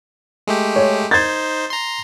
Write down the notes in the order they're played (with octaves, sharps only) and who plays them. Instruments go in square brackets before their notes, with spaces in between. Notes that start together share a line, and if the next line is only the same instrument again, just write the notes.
[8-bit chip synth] G#3 A3 G4
[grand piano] C#5
[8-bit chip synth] D#4 C5 [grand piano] G#6 A6
[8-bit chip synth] A#5 C6